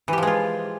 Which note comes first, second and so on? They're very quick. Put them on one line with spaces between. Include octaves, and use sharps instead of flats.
E3 G4 F3 G#3 F4